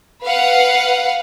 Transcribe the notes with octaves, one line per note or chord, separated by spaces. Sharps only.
B4 F5 F#5